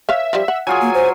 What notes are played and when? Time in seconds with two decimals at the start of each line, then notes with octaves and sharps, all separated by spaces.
0.09 B4 C#5 E5 F5
0.33 F3 G3
0.48 F#5
0.67 F#3 F4 G#4 G#5
0.82 A#3
0.94 C5